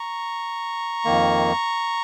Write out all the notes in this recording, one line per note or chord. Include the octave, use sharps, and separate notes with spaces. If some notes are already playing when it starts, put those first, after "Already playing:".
Already playing: A#5 C#6
F2 D#3 A#3